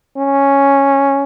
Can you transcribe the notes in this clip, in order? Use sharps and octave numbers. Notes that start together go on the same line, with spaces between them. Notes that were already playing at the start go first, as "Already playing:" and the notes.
C#4